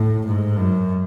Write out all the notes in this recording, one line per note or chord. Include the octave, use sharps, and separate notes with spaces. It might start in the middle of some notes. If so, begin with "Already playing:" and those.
Already playing: A2
G#2
F#2